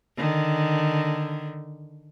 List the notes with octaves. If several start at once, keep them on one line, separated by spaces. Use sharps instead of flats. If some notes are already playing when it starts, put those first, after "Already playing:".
D3 D#3